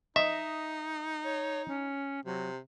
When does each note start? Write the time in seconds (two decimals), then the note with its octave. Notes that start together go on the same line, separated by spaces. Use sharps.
0.16 D#4 D#5 E5
1.24 C#5
1.68 C#4
2.25 C3 F#3